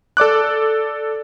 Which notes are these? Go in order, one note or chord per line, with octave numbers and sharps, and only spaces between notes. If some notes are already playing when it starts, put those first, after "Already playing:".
A4 D5 D6 F#6